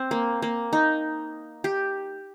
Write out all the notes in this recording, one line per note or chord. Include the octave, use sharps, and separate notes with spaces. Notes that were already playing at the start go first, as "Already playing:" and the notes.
Already playing: C4
A#3
A#3
D#4
G4